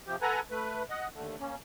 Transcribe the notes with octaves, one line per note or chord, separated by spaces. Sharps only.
C3 F3 G4
A4 B4 F#5 G#5 A#5
A3 B4
D#5 F#5
D#2 D3 A3
A#3 C#4